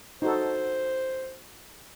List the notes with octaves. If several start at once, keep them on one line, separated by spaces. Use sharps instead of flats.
D#4 F#4 A4 C5